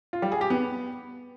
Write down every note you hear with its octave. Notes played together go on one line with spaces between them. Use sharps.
F4
G3
G#4
G4
B3